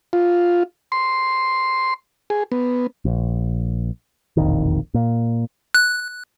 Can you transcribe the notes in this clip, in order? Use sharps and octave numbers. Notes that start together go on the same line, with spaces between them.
F4
C6
G#4
B3
A#1
E1 A#1 F2 D#3
A#2
F#6